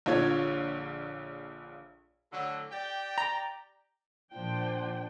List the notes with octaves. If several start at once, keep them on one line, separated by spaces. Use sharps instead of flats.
A#1 D3 F4 C#5 G#6
A2 D3 F#3
G4 D5 G5
A#5
A#2 F3 D4 C5 G5